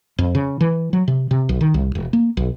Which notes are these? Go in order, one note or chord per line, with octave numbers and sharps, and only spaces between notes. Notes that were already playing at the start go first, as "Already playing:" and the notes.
F2
C#3
E3
F#3
C3
C3
B1
D#3
C2
E1
A#3
B1